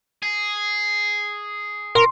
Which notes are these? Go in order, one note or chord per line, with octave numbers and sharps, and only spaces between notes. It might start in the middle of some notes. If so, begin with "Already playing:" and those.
G#4
A#4 C6